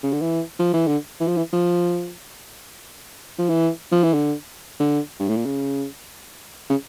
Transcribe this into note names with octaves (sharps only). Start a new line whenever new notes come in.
C#3
D3
E3
F3
E3
D3
E3
F3
E3
F3
F3
E3
F3
E3
D3
D3
G2
A2
A#2
C#3
C#3